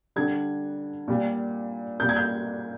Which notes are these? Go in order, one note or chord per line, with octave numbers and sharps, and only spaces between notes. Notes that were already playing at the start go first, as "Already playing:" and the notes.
D3 G3 G#6
A#2 G3
A#2 G3 G6
G#6
G6